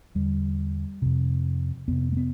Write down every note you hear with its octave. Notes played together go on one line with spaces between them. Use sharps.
E2 D3 G3
F2 C3
F2 C3 B3
A3
B3